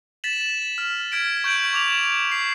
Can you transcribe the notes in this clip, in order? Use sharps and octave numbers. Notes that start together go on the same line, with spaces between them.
A6 B6 E7 F#7
F6
F6 G#6 B6 D7
C#6 G6 D7 F#7
C#6 D6 F7 F#7
C7